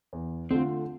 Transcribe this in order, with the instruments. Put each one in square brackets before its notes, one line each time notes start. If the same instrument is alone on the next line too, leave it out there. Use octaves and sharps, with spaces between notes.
[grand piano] E2
[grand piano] D3 A3 D4 F4 [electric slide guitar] C4